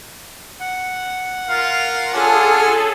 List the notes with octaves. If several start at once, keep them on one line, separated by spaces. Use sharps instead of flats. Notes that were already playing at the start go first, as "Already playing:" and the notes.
F#5
F4 A#4 F5
C#4 D4 F4 G#4 A4 G#5